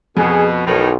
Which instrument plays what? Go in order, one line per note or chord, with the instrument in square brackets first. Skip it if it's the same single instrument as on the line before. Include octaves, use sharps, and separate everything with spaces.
[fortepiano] F2 [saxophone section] B2 [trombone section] G#4
[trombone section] B1 [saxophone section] A2 D#3